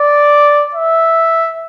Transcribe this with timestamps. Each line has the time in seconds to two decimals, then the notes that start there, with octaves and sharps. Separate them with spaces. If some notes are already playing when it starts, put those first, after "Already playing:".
Already playing: D5
0.75 E5